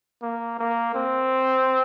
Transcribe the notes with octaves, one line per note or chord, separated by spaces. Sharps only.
A#3
A#3
C4